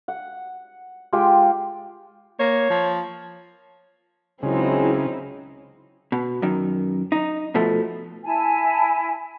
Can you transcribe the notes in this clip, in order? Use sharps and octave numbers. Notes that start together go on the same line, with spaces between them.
F#5
G#3 F4 G4 G5
A#3 C#5
F3
C#2 C#3 F#3 G#3 C4 D#4 E4
B2
F#2 D#3
D#4
B2 F3 A3
E4 G#5 A5